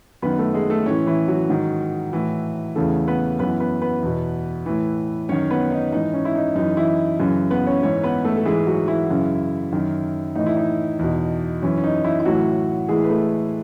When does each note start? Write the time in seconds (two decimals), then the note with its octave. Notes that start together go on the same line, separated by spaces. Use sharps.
0.22 F#2 D#3 B3 B4
0.39 A3 A4
0.54 G#3 G#4
0.70 A3 A4
0.86 A2 E3 C#4
1.07 E3 E4
1.28 F#3 F#4
1.49 G#2 D#3
2.13 A2 E3
2.76 E2 C#3 E3 A3 A4
3.08 B3 B4
3.39 F#2 E3 B3 B4
3.60 B3 B4
3.82 B3 B4
4.03 E2 B2
4.66 A2 E3
5.29 F#2 D#3 C#4 C#5
5.51 B3 B4
5.71 D#4
5.92 G#2 E3 D#4
6.13 C#4
6.25 E4
6.35 D#4
6.55 F#2 E3 D#4
6.77 E3 E4
7.19 F#2 C#3 E3
7.50 B3 B4
7.66 C#4 C#5
7.83 G#2 E3 C#4 C#5
8.03 B3 B4
8.25 A3 A4
8.37 A4
8.45 G#2 E3 G#3 G#4
8.67 F#3 F#4
8.88 E3 E4
9.09 F#2 C#3 E3
9.73 F#2 D#3
10.36 A2 E3 D#4
10.46 E4
10.57 D#4
10.99 E2 B2
11.62 F#2 E3 C#4
11.78 C#4
11.84 D#4
12.04 E3 E4
12.20 E4
12.25 A2 E3 F#3 F#4
12.89 A2 E3 G#3 G#4
13.04 B4
13.10 A3 A4